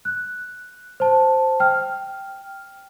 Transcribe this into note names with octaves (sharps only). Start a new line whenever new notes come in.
F#6
C5 A5
G5 F6